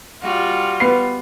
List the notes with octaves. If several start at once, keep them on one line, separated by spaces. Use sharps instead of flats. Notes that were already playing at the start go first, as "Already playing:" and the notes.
G3 F4 F#4
B3 C7